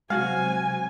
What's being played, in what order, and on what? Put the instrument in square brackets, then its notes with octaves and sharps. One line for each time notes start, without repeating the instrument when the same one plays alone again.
[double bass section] C3 F#3 C4 [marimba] G#3 [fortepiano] F#4 F5 [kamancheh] G#5